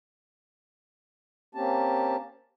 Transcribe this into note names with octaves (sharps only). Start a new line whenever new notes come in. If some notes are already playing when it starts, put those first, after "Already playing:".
A#3 C4 C#4 G4 A5